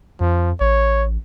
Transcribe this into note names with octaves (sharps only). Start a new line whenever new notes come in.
F2 F3
A1 C#5